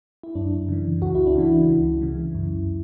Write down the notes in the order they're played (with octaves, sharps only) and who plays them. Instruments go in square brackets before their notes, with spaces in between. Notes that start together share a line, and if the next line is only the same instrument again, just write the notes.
[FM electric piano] E4
F#2 D4
C#3 E3
C#2 F#4
E4
D4
C#3 E3 E4
C#2
C#3 E3
F#2